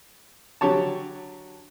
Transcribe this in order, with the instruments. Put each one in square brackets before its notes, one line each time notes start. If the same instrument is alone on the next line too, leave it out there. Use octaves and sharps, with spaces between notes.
[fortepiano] D3 F#3 G4 C#5 A5